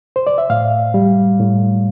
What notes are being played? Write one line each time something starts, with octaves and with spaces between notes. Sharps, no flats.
C5
D5
E5
A2 F5
G3
A2